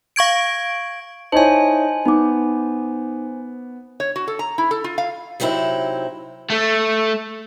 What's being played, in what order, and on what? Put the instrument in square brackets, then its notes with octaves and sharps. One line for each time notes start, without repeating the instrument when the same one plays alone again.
[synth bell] F5 C#6 G#6 D7
[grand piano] D#4 E4 C#5 [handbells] C5 G#5 [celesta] D#5 A5
[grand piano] B3 [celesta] D#4 D6
[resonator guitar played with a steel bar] C#5
F#4
A4
A#5
E4
A4
F4
F5
[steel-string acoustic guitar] C3 F#3 C4 D#4 E4
[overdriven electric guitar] A3